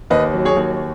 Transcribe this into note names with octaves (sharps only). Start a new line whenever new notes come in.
D#2 B4 D#5
F#3
G#4 C#5
D#2